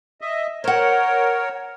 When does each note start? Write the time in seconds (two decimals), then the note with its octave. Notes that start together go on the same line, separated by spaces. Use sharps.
0.21 D#5 E5
0.64 A#4 C5 C#5 F#5